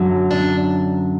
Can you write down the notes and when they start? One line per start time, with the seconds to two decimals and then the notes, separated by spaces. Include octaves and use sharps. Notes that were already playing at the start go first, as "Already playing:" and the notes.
Already playing: F#2 D3 F#3
0.31 D4